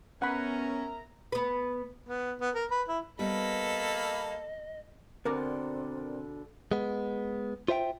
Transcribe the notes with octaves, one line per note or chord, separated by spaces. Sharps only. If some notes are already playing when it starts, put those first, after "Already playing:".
B3 C#4 A#4 E5 F#5 A#5 B5
B3 B4
B3
B3
A#4
B4
E4
G3 A#3 B3 A4 B4 D#5 B5
B2 D3 C4 A#4 D5
G#3 B3
F4 C5 E5 F5 G5